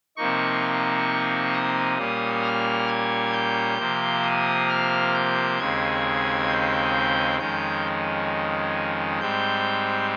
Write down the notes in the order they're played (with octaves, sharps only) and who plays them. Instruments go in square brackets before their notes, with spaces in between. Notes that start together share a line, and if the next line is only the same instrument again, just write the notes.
[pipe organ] C3 F3 A#3 D#4 C#6
D#6
A#2 G3 A#3 C#4
F6
G#6
G6
C3 F3 A#3
D#6
F6
G6
D#2 C#3 G#3 C4 G#6
G6
F2 D#3 G#3 C#4 G6
G#2 G3 C4 G6